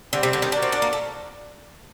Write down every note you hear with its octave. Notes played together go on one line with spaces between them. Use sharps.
D3 G3 C4 G4
C3
D3
D#3
D4 F#4 A#4 D5
C4
D4
A#3
A3